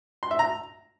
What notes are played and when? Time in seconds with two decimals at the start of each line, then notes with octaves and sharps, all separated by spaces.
0.23 C6
0.31 E5
0.39 A#5